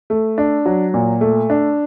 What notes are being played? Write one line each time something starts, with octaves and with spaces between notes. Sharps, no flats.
A3
D4
F#3
A#2
A3
D4